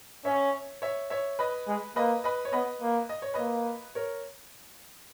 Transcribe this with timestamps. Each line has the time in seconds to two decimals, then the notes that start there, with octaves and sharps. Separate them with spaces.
0.25 C#4 C#5 E5
0.82 C#5 E5
1.10 C#5 E5
1.39 B4 D#5
1.68 G#3
1.96 A#3 B4 D#5
2.24 B4 D#5
2.45 C#5
2.53 B3 B4 D#5
2.82 A#3
3.09 D#5
3.22 C#5
3.34 A#3 B4 D#5
3.95 A#4 C#5